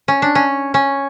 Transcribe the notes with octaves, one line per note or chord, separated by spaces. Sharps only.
C#4
D4
C#4
C#4